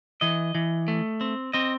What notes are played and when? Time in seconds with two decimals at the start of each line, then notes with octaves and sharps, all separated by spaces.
0.21 E3 D#5
0.55 E3
0.88 A3
1.21 C4
1.53 C4 D#5